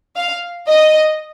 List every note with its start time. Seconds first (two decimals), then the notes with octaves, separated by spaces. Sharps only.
0.16 F5
0.68 D#5